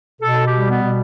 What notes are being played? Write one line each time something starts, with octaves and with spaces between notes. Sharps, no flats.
B2 A4
G4
G3
B3
B2